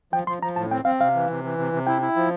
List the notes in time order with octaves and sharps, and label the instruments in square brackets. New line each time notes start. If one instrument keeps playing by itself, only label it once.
[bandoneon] F3 [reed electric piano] G5
[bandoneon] F3 [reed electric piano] C6
[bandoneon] F3 [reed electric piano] A#5
[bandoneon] A2 [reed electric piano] A5
[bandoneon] C4 [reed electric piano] G5
[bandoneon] C4 [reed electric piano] F5
[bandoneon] C3 [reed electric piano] F5
[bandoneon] E3
C3
E3
C3
C3
[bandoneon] E4 [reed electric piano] G5
[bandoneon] E4
F3